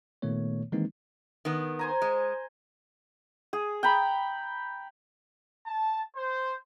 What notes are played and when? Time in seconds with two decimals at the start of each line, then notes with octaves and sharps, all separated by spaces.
0.22 A#2 D#3 A3 B3 C#5
0.72 D#3 E3 G#3 A#3 C4 D#4
1.45 D#3 B3
1.79 C5 G#5 A#5
2.02 G#3 C5 G#5
3.53 G#4
3.83 G5 A#5 B5
5.66 A5
6.15 C5